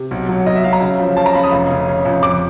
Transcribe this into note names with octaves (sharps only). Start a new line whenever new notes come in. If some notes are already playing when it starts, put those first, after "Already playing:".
Already playing: C3
B1
F#3
B1 D#5
E5
F#3 F5
A#5
C#3
F3
C#3 A5
A#5
C#3 B5
D#6
F1
C#3
C#3
F2
F2 D6